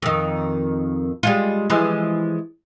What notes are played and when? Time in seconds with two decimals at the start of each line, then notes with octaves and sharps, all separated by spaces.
0.02 F2 D#3
1.23 G3 G#3 F4
1.70 E3 F3 G#3